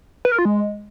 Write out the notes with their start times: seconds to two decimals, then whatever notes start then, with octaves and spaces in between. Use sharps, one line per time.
0.25 B4
0.32 A#4
0.38 F4
0.45 G#3